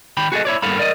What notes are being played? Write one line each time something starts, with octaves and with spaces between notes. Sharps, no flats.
D#3 G5 B5
F#4 G#4 A4 D#5
E4 C#5 D5
G2 A#3 B3 A4 F5 B5
A#4 D5 D#5